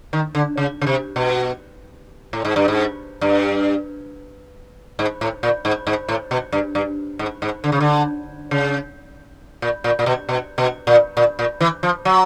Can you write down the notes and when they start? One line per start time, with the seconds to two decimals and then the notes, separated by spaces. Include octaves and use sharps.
0.13 D#3
0.35 D3
0.57 C#3
0.81 C#3
0.87 C3
1.16 B2
2.33 A2
2.45 G#2
2.56 G2
2.68 G#2
3.21 G2
4.99 G#2
5.21 A2
5.43 A#2
5.65 G#2
5.87 G#2
6.09 A2
6.31 B2
6.52 G2
6.75 G2
7.19 G#2
7.42 G#2
7.64 D3
7.72 C#3
7.81 D3
8.51 C#3
9.62 A#2
9.84 A#2
9.99 A#2
10.06 B2
10.29 B2
10.58 B2
10.87 A#2
11.17 A#2
11.39 A#2
11.61 E3
11.83 F3
12.05 F#3